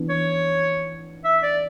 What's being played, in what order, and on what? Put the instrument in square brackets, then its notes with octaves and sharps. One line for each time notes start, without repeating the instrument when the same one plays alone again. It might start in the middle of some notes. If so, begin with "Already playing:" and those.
Already playing: [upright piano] E3 B3 D4
[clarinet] C#5
E5
D5